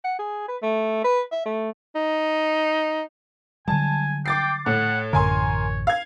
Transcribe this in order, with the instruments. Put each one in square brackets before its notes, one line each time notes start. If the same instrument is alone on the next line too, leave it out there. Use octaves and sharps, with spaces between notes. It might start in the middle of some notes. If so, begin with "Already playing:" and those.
[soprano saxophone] F#5
G#4
B4
A3
B4
E5
A3
[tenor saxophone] D#4
[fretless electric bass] D3 F#3 G3 [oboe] G#5 [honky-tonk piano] A5
[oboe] G5 [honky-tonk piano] D6 A6 C7
[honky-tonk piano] A2 [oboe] F#5
[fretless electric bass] A1 F#2 D3 [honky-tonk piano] A#4 G#5 C6 [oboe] C#5
[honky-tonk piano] F5 G#6